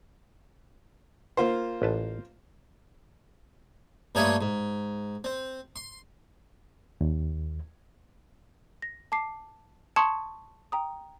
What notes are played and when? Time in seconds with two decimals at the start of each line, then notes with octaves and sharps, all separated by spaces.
1.37 A#3 F4 C5
1.82 A1 B4 A5
4.15 G2 A3 A#3 B4 C#5 D#6
4.41 G#2
5.24 C4
5.76 C6
7.01 D#2
8.82 A#6
9.12 A5 D6 C7
9.96 A5 C6 C#6 D#6 G#6 C#7
10.72 G5 A#5 D#6